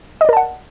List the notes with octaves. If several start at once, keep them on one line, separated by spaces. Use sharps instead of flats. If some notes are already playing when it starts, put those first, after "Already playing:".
A#4 D5 D#5 F#5 A5